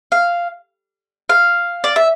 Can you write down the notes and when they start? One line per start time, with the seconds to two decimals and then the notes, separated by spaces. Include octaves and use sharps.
0.12 F5
1.29 F5
1.84 D5
1.96 E5